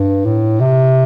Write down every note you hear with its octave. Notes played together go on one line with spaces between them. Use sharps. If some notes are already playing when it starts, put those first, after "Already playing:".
Already playing: G2
A2
C3